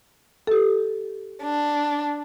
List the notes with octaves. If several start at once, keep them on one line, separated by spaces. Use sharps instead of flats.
G4 A4
D4